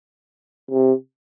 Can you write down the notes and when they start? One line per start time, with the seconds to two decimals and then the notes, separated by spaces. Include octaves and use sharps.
0.71 C3